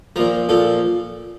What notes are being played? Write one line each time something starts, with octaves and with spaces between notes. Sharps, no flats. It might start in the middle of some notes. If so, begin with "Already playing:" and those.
A#2 F3 A#4
A#2 F3 A4